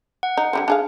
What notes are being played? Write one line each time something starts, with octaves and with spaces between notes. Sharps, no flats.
F#5
D#4
D3 G3 C4
D4 G#4 F5